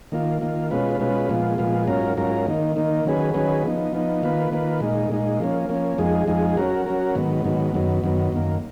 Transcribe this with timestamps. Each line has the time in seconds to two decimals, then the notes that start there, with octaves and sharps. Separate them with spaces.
0.12 D#3 A#3 F4
0.41 D#3 A#3 F4
0.71 B2 G#3 C#4 F4 B4
1.00 B2 G#3 C#4 F4 B4
1.29 A#2 F3 G#3 B3 F4
1.58 A#2 F3 G#3 B3 F4
1.87 G#2 F#3 C#4 F4 A#4
2.17 G#2 F#3 C#4 F4 A#4
2.47 D#3 A#3 D#4
2.76 D#3 A#3 D#4
3.05 D#3 F#3 C#4 G#4 B4
3.34 D#3 F#3 C#4 G#4 B4
3.64 F3 B3 D#4
3.93 F3 B3 D#4
4.22 D#3 A#3 F4 B4
4.52 D#3 A#3 F4 B4
4.80 A#2 G#3 D#4
5.10 A#2 G#3 D#4
5.40 F3 A#3 C#4
5.69 F3 A#3 C#4
5.98 F2 F3 G#3 D#4 G#4
6.27 F2 F3 G#3 D#4 G#4
6.57 F#3 C#4 F#4 A#4
6.86 F#3 C#4 F#4 A#4
7.15 G#2 D#3 F#3 B3
7.44 G#2 D#3 F#3 B3
7.74 F#2 D#3 F#3 B3
8.04 F#2 D#3 F#3 B3
8.32 F#2 D#3 A#3